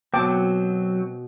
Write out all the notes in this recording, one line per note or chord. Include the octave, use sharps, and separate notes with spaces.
B2 F#3 C4 G5 A5 D6